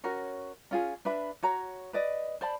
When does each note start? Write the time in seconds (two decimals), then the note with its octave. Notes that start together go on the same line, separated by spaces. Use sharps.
0.04 C#4 F#4 A#4 C#5
0.71 C#4 F4 G#4
1.05 D4 B4 E5 B5
1.43 F#4 C#5 A#5
1.93 B4 D5 D#5
2.41 C5 D5 A5 B5